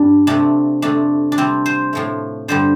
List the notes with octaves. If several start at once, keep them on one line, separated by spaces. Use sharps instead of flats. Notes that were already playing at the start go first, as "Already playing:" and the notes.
Already playing: G2 G3 D4
C3 F3 A3 D4
F2 C3 A3 D4
D4
C3 G3 C4
C5
A2 F3 A3
G2 D3 G3 C5